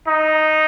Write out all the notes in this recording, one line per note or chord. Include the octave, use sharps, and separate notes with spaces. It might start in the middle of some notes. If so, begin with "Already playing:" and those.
D#4